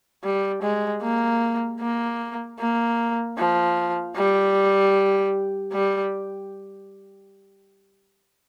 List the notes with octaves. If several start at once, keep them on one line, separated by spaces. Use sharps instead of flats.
G3
G#3
A#3
A#3
A#3
F3
G3
G3